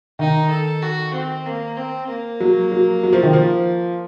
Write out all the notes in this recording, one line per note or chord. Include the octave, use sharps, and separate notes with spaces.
D#3 D#4
A4
F#4
C4
A#3
C4
A#3
F#3
F#3
F#3
F3
D#3
F3